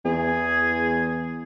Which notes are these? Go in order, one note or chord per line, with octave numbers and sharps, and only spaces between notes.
E2 G#4